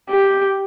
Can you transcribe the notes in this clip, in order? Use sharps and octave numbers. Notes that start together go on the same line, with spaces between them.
G4